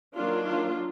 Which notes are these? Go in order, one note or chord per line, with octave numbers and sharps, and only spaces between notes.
D#3 F#3 A#3 D4 F4
F4